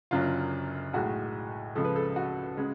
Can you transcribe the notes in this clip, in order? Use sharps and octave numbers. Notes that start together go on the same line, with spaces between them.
F#1 F#2 D3 F#3 F4
B1 A2 G#3 F#4
C#2 C#3 F3 G#3 A4
B4
A4
F#4
C#3 G#3